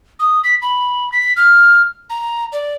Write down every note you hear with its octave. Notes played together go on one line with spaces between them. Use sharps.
D#6
B6
B5
B6
F6
A#5
D5